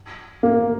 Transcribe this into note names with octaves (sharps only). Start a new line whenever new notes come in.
A#3